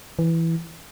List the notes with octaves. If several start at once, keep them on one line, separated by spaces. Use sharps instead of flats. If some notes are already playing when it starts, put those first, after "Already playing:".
E3